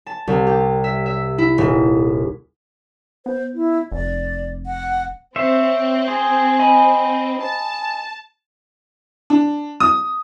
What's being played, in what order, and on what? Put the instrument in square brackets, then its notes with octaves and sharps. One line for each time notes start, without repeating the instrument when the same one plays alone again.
[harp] A5
C2
G4
E5
E5
E4
D#1
[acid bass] B3 [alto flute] C5
[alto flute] E4
[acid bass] F1 [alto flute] D5
[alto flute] F#5
[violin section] C4 [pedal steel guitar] C5 C#5 E5
[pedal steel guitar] G#4 C6
D#5 G#5 B5
[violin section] A5
[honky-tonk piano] D4
D#6